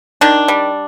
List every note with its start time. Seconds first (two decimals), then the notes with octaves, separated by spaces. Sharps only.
0.21 D#3 D4
0.48 G3